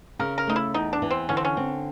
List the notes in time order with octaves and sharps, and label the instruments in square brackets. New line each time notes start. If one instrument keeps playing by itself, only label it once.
[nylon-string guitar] C#3 [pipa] A#4
[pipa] A#4
[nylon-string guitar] A3 [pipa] D#4
[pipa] E4
[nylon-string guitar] E2 [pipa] D#4
[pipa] D4
[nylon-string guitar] E3
[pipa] C4
[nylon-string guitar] D3 [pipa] C#4
[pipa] C4
C#4
[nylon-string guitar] C4